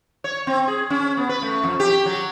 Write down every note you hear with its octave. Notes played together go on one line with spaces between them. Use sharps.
C#5
C4
G#4
C#4
B3
B4
A3
F2
G4
F#3